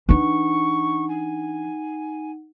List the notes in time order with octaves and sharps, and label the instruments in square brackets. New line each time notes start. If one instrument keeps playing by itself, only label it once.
[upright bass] E3 D4 [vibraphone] D#4 F#5 [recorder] C#6
[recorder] G#5